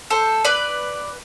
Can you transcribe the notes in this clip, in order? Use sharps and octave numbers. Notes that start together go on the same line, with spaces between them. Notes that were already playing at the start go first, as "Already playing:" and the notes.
A4 C5
B4 D5